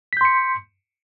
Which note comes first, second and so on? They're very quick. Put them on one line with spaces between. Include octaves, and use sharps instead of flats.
B6 G6 C6 C#7